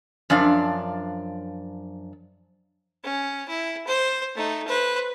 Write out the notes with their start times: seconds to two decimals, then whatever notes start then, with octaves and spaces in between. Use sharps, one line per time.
0.30 F#2 F3 D4 F5
3.04 C#4
3.48 E4
3.87 C5
4.35 A3 D#4
4.67 B4 C5